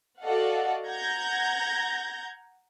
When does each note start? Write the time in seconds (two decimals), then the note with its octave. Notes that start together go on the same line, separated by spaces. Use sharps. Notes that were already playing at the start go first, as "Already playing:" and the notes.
0.23 F#4 A4 D5 D#5 F5 F#5
0.89 F#5 A#5 G6 G#6 A#6